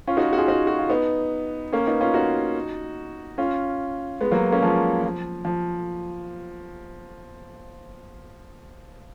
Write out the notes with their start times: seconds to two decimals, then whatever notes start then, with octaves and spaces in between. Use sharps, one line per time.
0.07 C#4 F4
0.17 D#4 F#4
0.33 F#4
0.37 F4 G#4
0.48 D#4 F#4
0.67 F#4
0.79 F4
0.90 B3 D#4
1.73 A#3 C#4
1.86 B3 D#4
2.00 C#4 F4
2.14 D#4 F#4
3.38 C#4 F4
4.21 G#3 B3
4.31 F#3 A#3
4.52 A#3 C#4
4.62 F3 G#3
5.03 F3
5.45 F3